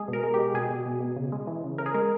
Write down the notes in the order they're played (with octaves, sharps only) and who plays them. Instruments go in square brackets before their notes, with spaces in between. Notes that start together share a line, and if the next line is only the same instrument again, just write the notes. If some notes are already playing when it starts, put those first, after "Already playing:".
Already playing: [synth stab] G#3 G#4
B2
A#4
G#3
G4
G#3
B2 G#4
B2
B2
B2
C#3
G#3
E3
C#3
C#3 A#4
G#4
G#3 A#4